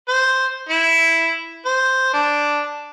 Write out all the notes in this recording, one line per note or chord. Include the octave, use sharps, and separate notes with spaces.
C5
E4
C5
D4